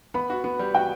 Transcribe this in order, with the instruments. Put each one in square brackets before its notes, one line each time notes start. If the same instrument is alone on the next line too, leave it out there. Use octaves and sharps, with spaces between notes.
[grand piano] B3 [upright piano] B5
[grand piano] F#4
B3
G3
[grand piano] F#4 [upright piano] G5